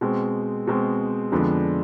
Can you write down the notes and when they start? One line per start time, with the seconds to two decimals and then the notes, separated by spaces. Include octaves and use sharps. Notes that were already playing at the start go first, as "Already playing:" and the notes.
0.01 B2 G#3 C4
0.67 B2 G#3 C4
1.32 F2 D3 G#3 B3 D4